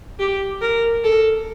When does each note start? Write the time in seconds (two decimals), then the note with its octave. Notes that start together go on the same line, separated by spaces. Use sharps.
0.19 G4
0.61 A#4
1.04 A4